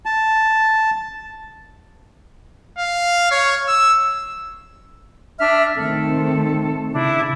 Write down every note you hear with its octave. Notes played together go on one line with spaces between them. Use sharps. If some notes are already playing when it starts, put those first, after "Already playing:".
A5
F5
C#5
E6
D4 E5 F6
D#3 A3 C4 A4
C#3 D4 E4